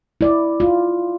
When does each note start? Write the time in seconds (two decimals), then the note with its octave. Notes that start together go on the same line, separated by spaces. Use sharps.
0.21 E4 D5
0.60 F4